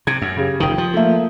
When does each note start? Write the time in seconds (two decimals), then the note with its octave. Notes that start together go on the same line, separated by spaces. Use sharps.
0.07 C3 G#6
0.22 F#2
0.37 C#3 G4
0.60 F1 D#3 G5 D#6
0.78 F3
0.94 A3 A#3 E5